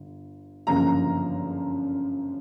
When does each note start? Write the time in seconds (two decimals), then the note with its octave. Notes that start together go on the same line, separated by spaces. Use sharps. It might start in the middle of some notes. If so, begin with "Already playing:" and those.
Already playing: G1
0.67 G1 F#2 C#3 F3 A#3 A#5